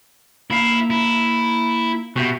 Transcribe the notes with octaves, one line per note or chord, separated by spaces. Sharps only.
A#3 E4 F5
E4
B2 F#4 G4 E5